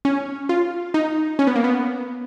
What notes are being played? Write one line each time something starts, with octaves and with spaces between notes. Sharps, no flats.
C#4
F4
D#4
C#4
B3
A#3
B3